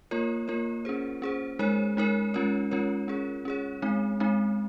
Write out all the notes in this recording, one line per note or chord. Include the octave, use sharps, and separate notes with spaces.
A#3 F4 A#4 C#5
A#3 F4 A#4 C#5
C#4 G#4 C5
C#4 G#4 C5
G#3 D#4 A#4 C#5
G#3 D#4 A#4 C#5
G#3 C#4 F4 A#4 C#5
G#3 C#4 F4 A#4 C#5
C#4 G#4 C#5
C#4 G#4 C#5
G#3 C4 D#4
G#3 C4 D#4